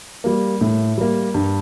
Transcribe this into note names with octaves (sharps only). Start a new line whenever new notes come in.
G3 A#3
A2
G3 A#3
G2